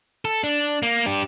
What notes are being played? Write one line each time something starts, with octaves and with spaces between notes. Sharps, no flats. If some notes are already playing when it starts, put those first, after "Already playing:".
A4
D4
A#3
D4 G4